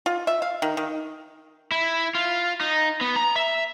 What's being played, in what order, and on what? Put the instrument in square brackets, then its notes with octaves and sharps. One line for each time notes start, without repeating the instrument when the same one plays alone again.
[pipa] F4
E5
F5
D#3
D#3
[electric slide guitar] E4
F4
D#4
B3
A#5
E5